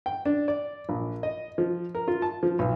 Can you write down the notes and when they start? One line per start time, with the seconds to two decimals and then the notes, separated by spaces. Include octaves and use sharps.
0.06 G5
0.25 D4
0.48 D5
0.89 A#1
1.23 D#5
1.58 F3
1.95 A#4
2.08 F4
2.22 A5
2.43 F3
2.59 B1